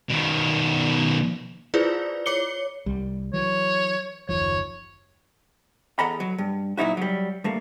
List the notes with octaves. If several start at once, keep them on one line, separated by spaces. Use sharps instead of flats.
B2 D#3
E4 F4 G#4 B4 C5 D5
C#5 D6 C#7 G7
C2 G3
E3 F#3 C#5
F#1 D#2 F3 C#5
E2 A4 D#5 F#5 A#5 B5
F#3
G2
A#2 F#3 D#4 E4 F#4
F#3 G3
G2 A3 A#3